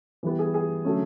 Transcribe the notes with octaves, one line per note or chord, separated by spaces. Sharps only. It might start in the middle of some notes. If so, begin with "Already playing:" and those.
E3 G3 B3
G#4
G#4
D3 F#3 A3 C#4